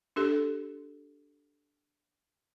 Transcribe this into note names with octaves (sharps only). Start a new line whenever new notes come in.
D4 G4 A4